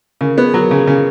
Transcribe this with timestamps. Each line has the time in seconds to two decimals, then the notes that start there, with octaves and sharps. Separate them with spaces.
0.21 C#3 A#4
0.37 B3 G#4
0.54 F#3 A#4
0.71 C#3 G#4
0.87 C#3